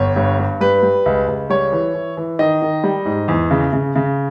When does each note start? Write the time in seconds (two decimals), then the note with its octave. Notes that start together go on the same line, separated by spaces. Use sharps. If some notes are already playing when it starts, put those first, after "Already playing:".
Already playing: G1 C#5
0.16 G2
0.38 G2
0.61 G3 B4
0.83 G3
1.06 C#2
1.28 C#2
1.50 G3 C#5
1.72 E3
1.95 E3
2.17 E3
2.39 D#3 D#5
2.62 D#3
2.84 G3
3.05 G#2
3.28 E2
3.51 C#3
3.73 C#3
3.95 C#3